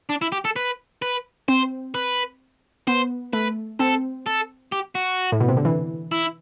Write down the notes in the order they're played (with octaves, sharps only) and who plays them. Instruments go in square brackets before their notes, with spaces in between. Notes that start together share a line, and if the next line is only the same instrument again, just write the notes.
[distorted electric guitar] D4
E4
G4
A4
B4
B4
[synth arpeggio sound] C4 [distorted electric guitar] C5
[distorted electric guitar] B4
[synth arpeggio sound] B3 [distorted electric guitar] C5
[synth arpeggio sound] A3 [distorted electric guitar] B4
[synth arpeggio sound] C4 [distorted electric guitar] A4
[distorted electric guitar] A4
G4
F#4
[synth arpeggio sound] A2
B2
C3
D3
E3
[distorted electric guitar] E4